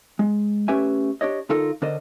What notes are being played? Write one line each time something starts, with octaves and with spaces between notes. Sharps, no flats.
G#3
A3 C#4 G4 B4 E5 G#5
D4 G4 C#5 D#5
D3 D#4 F4 A4 A#4
D3 D4 A#4 C5 D#5